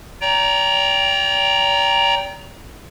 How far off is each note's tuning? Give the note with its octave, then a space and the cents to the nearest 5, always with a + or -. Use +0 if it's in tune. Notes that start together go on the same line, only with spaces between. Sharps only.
D5 -45 G5 +0 A#5 +0